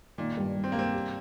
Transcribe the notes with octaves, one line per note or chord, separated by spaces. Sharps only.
A#2 D#3
G2
G3
C4
A#3
G2 C4
G4